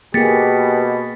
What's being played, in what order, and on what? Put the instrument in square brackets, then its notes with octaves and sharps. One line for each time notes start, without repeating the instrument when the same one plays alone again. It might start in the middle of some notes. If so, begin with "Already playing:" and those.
[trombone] B2 [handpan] A#3 G#4 [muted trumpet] G4 [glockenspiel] A6 B6 C#7